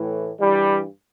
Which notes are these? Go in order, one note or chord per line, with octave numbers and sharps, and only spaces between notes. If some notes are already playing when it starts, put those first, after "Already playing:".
Already playing: A2 E3
G2 E3 G3